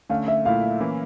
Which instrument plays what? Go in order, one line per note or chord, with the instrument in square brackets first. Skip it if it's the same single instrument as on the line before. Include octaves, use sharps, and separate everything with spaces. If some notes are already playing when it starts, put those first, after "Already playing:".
[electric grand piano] D3 A3 C#4 [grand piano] F5
[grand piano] E5
[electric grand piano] A#2 A3 E4 [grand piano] F5
[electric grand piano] E3 A#3 C#4 E4